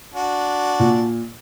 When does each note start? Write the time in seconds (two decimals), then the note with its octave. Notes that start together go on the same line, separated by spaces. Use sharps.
0.14 D4 F#4
0.79 A#2